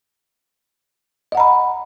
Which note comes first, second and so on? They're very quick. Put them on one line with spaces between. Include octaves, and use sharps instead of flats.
D#5 F#5 A#5 B5